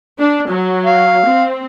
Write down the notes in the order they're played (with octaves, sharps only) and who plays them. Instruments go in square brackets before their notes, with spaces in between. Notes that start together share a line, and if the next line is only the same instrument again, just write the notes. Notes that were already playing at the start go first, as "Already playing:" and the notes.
[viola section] D4
F#3
[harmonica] F5
[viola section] C4